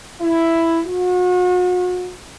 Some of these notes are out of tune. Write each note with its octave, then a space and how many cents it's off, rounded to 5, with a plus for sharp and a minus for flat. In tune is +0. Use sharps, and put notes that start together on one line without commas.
E4 +5
F#4 -40